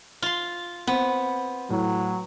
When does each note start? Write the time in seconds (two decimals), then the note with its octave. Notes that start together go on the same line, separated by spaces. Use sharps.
0.22 F4 C6
0.87 B3 C4
1.70 A2 F#3